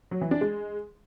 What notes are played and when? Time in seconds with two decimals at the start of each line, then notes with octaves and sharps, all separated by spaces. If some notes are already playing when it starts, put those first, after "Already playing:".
0.11 F#3
0.21 E3
0.31 D4
0.41 G#3